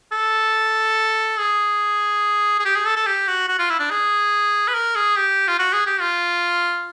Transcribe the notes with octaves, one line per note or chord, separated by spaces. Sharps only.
A4
G#4
G#4
G4
G#4
A4
A4
G4
F#4
F#4
F4
E4
D4
G#4
B4
A#4
G#4
G4
F4
F#4
G#4
G4
F4